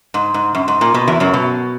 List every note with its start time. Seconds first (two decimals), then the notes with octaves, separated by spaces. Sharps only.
0.14 G#2
0.34 G#2
0.55 F#2
0.68 G#2
0.81 A#2
0.94 B2
1.08 E2 E3
1.20 F#2 F#3
1.34 B2